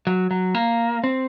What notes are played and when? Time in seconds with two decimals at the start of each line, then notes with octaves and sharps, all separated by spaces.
0.07 F#3
0.31 F#3
0.55 A#3
1.04 C4